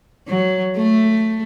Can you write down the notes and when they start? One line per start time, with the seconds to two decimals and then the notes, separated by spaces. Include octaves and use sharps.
0.28 F#3
0.76 A3